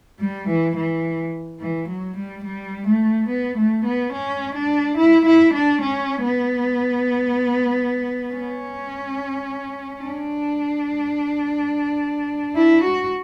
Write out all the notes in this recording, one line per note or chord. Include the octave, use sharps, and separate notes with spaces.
G3
E3
E3
E3
F#3
G3
G3
A3
B3
A3
B3
C#4
D4
E4
E4
D4
C#4
B3
C#4
D4
E4
F#4